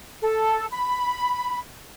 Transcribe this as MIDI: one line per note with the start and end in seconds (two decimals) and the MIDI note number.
0.22 0.65 69
0.71 1.58 83